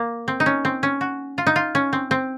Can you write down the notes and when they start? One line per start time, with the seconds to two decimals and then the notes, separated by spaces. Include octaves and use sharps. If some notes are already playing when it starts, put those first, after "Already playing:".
Already playing: A#3
0.28 C4
0.40 D#4
0.46 C#4
0.65 C4
0.83 C#4
1.01 F#4
1.38 F4
1.47 D#4
1.56 F4
1.75 C#4
1.93 C4
2.11 C4